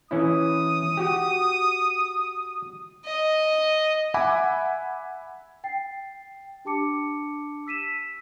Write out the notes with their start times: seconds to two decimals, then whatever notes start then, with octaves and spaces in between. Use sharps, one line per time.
0.11 E3 C#4 E4 D#6
0.97 F#4 G4
3.05 D#5
4.14 E5 F#5 G#5 B5 D6
5.64 G5 A6 C7
6.65 D4 G4 A5 D6 C#7
7.67 E6 B6 D#7 E7